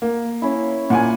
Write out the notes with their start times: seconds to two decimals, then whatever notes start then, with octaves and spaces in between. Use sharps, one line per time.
0.02 A#3
0.42 C#4 E4
0.90 A#2 F#5 G#5 D6